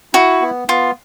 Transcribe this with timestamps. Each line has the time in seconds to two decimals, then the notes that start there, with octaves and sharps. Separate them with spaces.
0.14 E4 F#4
0.41 B3
0.68 B3 F4